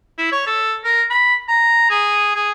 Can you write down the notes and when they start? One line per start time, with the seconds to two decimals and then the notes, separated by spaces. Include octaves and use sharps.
0.18 E4
0.32 C#5
0.47 A4
0.84 A#4
1.10 B5
1.48 A#5
1.90 G#4
2.35 G#4